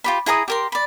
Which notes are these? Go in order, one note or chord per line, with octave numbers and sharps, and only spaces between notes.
F4 G4 B5
E4 G#4 A#5 D#6
G4 A#4 C6
D5 B5